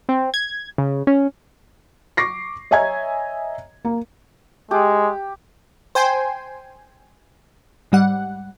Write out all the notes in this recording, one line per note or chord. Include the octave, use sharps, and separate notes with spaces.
C4
G#6
C#3
C#4
C#6 D6 A#6 C7
C#5 D#5 E5 G#5 A#5 G#6
A#3
G#3 G4
C5 G5 G#5 C6
G#2 G3 F#5